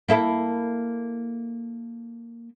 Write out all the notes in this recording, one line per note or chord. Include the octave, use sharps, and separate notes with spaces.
A#3 E4 A4